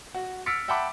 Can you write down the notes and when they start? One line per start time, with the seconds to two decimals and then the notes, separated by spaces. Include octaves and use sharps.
0.15 F#4
0.46 E6 F6 A6 B6 C#7 D7
0.68 E5 F#5 G5 A5 B5 D6